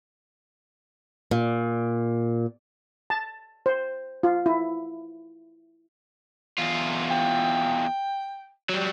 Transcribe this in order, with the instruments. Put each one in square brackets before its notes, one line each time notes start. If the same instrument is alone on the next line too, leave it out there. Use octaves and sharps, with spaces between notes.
[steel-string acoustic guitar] A#2
[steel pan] A5
C5
F4
E4
[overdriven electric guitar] E2 F4
[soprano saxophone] G5
[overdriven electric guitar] F#3 G3